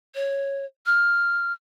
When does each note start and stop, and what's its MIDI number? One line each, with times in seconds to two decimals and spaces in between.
0.15 0.65 73
0.86 1.53 89